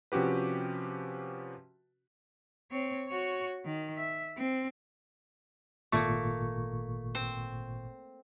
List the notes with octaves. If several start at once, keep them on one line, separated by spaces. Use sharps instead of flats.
C3 F3 C#4 F#4 G4 B4
C4 C#5
F#4 C#5
D#3
E5
C4
G#1 A#2 A3 A#3 C#6
C4 C5